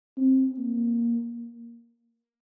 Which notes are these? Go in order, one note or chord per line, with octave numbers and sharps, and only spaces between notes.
C4
A#3